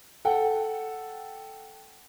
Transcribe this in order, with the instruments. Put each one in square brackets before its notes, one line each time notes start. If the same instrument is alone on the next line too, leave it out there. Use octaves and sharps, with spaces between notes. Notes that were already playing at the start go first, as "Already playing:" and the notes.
[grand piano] A4 F#5 G5